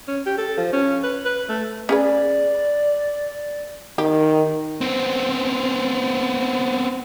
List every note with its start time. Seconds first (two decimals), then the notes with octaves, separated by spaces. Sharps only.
0.08 C#4
0.26 G4
0.38 A4
0.57 F3
0.73 C#4
1.03 B4
1.25 B4
1.49 A3
1.89 C#4 G#4 B4 D5
3.98 D#3 G4
4.81 B3 C4